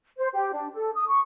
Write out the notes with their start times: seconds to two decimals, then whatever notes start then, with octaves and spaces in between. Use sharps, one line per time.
0.17 C5
0.33 G4
0.52 D4
0.75 A4
0.95 D#6
1.07 C#6